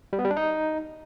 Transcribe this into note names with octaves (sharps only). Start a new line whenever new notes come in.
G3
B3
G3
D4
D#4